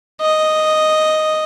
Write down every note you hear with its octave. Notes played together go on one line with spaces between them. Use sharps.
D#5